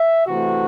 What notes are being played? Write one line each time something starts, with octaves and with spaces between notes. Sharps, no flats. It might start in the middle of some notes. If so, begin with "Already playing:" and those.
Already playing: E5
C3 E3 A3 C4 F#4